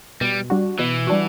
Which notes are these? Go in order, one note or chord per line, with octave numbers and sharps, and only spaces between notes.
B2 G3
G3 D4 F#4
B2 E3
G3 D4 F#4